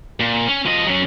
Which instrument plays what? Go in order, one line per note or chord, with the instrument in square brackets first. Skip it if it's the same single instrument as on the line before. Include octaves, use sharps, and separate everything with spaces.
[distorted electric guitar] A#2
C#4
F3 D#5
F#3 C#4